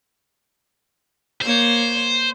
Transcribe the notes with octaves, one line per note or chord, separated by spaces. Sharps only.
A#3 C5 C#5